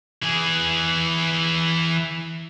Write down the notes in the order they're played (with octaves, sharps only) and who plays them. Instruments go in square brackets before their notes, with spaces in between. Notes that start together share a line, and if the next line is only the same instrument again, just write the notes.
[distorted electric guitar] E3 G#4